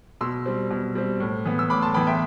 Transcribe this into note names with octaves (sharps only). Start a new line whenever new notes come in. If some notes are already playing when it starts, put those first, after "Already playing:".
B2 C6 E6
G3 C4
B2
G3 C4
A2
E3 B3
E6
A2 B5 D6
A5 C6
E3 B3 G5 B5
E5 G5